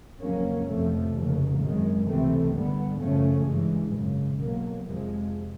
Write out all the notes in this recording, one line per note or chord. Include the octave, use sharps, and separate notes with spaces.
F2 C#3 F#3 A#3 C#4
F1 F2 C3 F3 A3
F1 D#2 C#3
G#1 F#2 D#3 G#3
C#2 C3 E3 A3 C4
G2 D3 G3 B3
F#2 C#3 F3 A3 C#4
G2 E3 G#3
G#1 F#2 C#3
B1 B2 F#3 A#3
F2 C3 F3 G#3